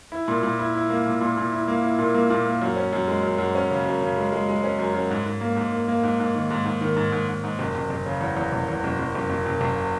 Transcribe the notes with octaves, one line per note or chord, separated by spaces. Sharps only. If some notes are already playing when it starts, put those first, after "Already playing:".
E4
A#2
A#2
E4
E4
A#3
A#2
A#2
A#2
E4
A#3
E4
A#2
A#3
A#2
A#3
F#2
C#4
F#2
G#3
F#2
F#2
C#4
C#3
F#2
C#3
G#3
G#3
G#3
C#4
F#2
F#2
G#2
G#2
A#3
G#2
A#3
A#3
G#2
G#2
D#3
G#2
G#2
D#3
G#2
G#2
G#2
G#2
F#1
F#1
F#1
C#3
E2
E2
F#1
E2
F#1
F#1
F#1
F#1
F#1
F#1